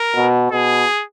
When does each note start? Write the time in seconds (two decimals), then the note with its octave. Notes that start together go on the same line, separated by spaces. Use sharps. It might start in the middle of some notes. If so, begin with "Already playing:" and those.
Already playing: A#4
0.16 B2
0.52 B2 G#4